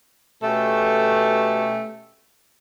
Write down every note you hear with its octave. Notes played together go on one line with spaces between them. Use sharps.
B2 A3 C#4 G4 A4